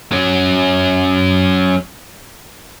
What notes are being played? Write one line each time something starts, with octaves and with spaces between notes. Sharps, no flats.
F#3 C#4